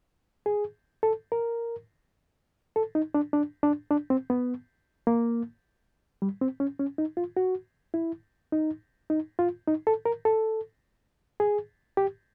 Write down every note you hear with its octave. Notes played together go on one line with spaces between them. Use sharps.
G#4
A4
A#4
A4
D#4
D4
D4
D4
D4
C4
B3
A#3
G3
C4
C#4
C#4
D#4
F4
F#4
E4
D#4
D#4
F4
D#4
A4
A#4
A4
G#4
G4